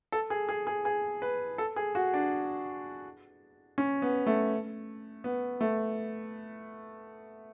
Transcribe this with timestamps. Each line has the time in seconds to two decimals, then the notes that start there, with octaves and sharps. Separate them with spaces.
0.12 A4
0.30 G#4
0.49 G#4
0.67 G#4
0.85 G#4
1.22 B4
1.58 A4
1.76 G#4
1.95 F#4
2.13 D4
3.78 C#4
4.02 B3
4.27 A3
5.24 B3
5.61 A3